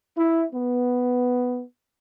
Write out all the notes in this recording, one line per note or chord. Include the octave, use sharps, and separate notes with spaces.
E4
B3